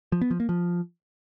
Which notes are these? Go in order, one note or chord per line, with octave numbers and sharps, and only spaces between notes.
F3
B3
F3
A#3
F3